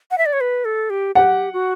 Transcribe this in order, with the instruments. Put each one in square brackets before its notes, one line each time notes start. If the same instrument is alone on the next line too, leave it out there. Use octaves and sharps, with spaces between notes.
[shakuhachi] F#5
E5
D5
C#5
B4
A4
G4
[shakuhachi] G4 [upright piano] F#5
[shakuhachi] F#4